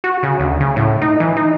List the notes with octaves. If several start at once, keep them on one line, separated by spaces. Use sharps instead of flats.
F#4
C#3
D2
C#3
A2
D#4
E3
D#4